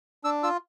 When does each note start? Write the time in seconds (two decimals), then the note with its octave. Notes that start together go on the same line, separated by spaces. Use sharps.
0.24 D4 E6
0.43 F4 E6